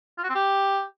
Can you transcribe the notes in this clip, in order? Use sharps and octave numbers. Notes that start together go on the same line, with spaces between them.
F4
F#4
C4
G4